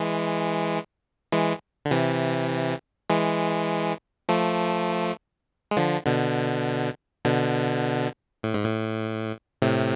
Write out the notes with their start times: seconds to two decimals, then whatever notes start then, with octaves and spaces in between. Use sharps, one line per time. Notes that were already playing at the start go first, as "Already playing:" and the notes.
Already playing: E3 G#3
1.32 E3 G#3
1.85 D3
1.91 C3 E3
3.10 E3 G#3
4.29 F3 A3
5.71 G#3
5.77 D3 F3
6.06 B2 D3
7.25 B2 D3
8.43 A2
8.54 G#2
8.64 A2
9.62 A2 C3